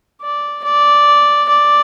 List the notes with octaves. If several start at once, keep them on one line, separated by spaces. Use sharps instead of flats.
D5
D5
D5